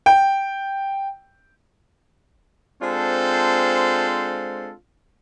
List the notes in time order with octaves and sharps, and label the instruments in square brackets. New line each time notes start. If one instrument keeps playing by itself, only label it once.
[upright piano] G5
[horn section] G#3 C4 D4 F4 A4 C5